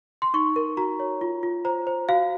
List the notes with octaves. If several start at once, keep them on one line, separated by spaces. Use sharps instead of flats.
C6
D#4 C#6
A#4
F#4 A#5
C#5
F4
F4
C5 A#5
C5
F#4 F5